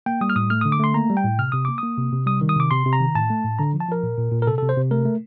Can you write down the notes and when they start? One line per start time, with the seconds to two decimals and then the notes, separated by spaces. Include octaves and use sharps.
0.06 A#3 G5
0.21 G3 D#6
0.30 F6
0.36 A2 D#6
0.50 A3 F6
0.61 D3 D#6
0.72 D6
0.80 A3 C6
0.94 A#3 A#5
1.10 G3
1.17 G5
1.24 A2
1.39 C3 F6
1.52 C3 D#6
1.65 A#3 D6
1.78 A#3 D#6
1.97 C3
2.12 C3
2.26 G3 D#6
2.41 D#3
2.49 D#6
2.56 C3 D6
2.71 C3 C6
2.86 C3
2.93 A#5
3.01 D#3
3.15 A2 A5
3.30 A3
3.44 A2
3.59 D3 A#5
3.74 F3
3.81 A5
3.88 F3 A#4
4.03 A#2
4.18 A#2
4.32 A#2
4.42 A#4
4.47 C3 A4
4.58 C3 A4
4.69 C5
4.77 C3
4.91 A3 A#4
5.05 A3